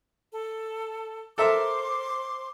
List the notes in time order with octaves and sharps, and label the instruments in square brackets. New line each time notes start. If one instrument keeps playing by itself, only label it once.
[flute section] A4
[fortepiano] A4 A#4 E5 [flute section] C5 C6 D6